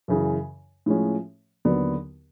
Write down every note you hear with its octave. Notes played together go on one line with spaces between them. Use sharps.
F#2 C#3 E3
A2 F3 G#3 C#4
D#2 D3 F#3 B3